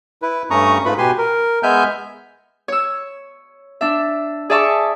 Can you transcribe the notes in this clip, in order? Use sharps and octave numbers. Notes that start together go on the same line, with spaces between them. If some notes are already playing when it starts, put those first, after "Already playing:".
E4 B4
G2 A3 C#4 A#5 C#6 D#6
G#2 A3 F4 B4 B5
B2 G4 B4 G#5 C6
A#4
G#3 B3 E5 G#5 F6 G6
C#5 E6
D4 E5
G#4 D5 E5 A5 C#6 D6